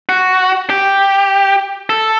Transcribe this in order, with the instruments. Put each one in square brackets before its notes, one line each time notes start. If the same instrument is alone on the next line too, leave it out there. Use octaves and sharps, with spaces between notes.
[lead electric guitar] F#4
G4
A4